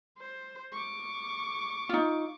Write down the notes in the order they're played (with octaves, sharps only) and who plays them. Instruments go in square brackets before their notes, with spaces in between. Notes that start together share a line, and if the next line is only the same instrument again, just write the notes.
[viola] C5
C#6 D6
[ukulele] D#4 F4